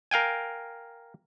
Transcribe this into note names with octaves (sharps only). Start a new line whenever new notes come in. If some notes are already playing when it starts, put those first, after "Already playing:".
A#4 F5 G5 G#5